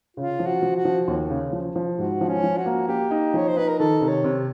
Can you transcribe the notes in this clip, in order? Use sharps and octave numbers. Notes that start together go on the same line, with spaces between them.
C#3 F4
F3
F#4
F3
F#4
F3
D#2
C#3
F3
F3
G#2 F#4
F3
C#4
F3
F#4
A#3
A#3 G4
D#4
F3 C#5
C5
D#4 B4
A#4
D#3 A4
C3
C#5
C3